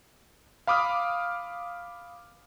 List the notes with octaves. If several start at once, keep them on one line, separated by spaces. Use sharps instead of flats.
F5 B5 D6 D#6 F6